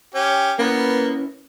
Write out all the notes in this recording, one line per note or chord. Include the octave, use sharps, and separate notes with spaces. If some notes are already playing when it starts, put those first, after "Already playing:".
C#4 G4
A#3 B3 C#4 E4 B4